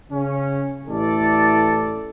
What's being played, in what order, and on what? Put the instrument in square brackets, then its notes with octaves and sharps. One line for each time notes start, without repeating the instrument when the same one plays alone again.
[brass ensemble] C#3 C#4
A1 E4 A4 D5